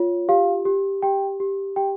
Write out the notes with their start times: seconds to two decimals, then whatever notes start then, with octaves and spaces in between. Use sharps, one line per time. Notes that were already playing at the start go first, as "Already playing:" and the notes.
Already playing: F4 C#5
0.29 G4 F5
0.65 G4
1.02 G4 G5
1.40 G4
1.76 G4 G5